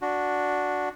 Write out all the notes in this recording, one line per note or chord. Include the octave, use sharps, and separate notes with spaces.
D4 F#4